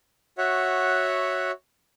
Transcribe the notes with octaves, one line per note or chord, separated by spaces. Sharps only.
F#4 C#5 E5 F#5